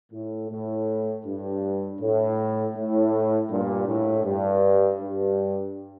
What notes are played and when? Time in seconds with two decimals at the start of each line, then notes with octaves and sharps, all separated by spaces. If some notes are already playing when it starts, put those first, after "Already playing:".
0.12 A2
0.51 A2
1.25 G2
2.01 A2
2.75 A2
3.50 G2 A#2
3.87 A2
4.24 G2
5.00 G2